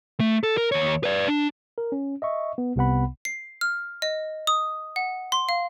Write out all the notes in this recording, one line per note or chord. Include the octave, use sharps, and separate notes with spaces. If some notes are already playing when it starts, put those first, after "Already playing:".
A3
A4
A#4
D#2 C#5
B4 D5
D4
A#4
C#4
D#5 E5 C#6
B3
C2 C3 B3 F#5 B5
C7
F6
D#5
D#6
F#5
C6
F5